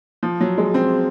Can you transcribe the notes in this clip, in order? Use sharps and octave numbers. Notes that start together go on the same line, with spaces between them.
F3
F#3
G#3
C4